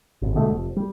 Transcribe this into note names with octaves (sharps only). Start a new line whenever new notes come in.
G#1
B2 D3 G#3 A3
F1
G3